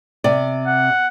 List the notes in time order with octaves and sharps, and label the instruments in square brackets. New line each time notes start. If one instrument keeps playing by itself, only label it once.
[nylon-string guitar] C3 [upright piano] D5
[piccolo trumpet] F#5